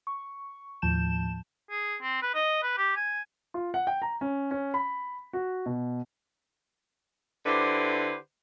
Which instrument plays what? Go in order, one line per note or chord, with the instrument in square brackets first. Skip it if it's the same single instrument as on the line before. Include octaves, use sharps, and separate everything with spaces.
[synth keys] C#6
D#2 A2 F3 A5 G6 E7
[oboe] G#4
C4
B4
D#5
B4
G4
G#5
[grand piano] F4
F#5
G5
A#5
C#4
C#4
B5
F#4
B2
[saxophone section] D3 E4 G4 B4 C5